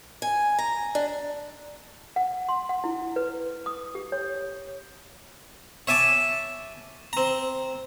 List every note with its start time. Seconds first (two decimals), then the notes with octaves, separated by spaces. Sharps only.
0.22 G#5
0.59 A#5
0.95 D4
2.16 F#5
2.49 C6
2.69 F#5
2.84 E4
3.16 B4
3.66 D#6
3.95 G4
4.12 C#5
5.87 C#5 E5 G#5 A5 D6
7.13 C4 A#5